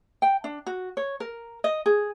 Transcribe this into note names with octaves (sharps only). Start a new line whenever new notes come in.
G5
D4
F#4
C#5
A#4
D#5
G#4